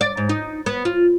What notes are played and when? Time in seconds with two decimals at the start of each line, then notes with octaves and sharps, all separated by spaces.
0.01 D5
0.17 G#2
0.29 D#4
0.66 B3
0.85 F4